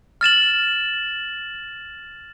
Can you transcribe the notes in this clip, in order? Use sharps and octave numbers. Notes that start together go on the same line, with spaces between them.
F6 A6 E7 F#7